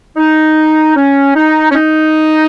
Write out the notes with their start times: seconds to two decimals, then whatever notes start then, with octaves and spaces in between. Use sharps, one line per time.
0.17 D#4
0.96 C#4
1.36 D#4
1.71 C#4
1.75 D#4